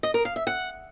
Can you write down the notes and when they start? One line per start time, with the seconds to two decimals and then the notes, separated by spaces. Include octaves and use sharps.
0.03 D#5
0.14 A#4
0.25 F5
0.36 E5
0.47 F#5